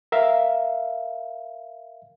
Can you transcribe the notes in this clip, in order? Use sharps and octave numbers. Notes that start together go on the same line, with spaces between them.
A#4 E5 F5